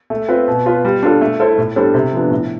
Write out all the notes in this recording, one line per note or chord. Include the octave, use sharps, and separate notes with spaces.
A3
C4 F4 B4
B2
B3 F4 B4
G3
D4 F4 A4
A3
E4 A4 C5
A2
G3 D4 A4 C5
C3
F3 B3 D4
A2